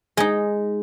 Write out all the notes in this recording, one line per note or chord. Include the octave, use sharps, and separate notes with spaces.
G#3 D#4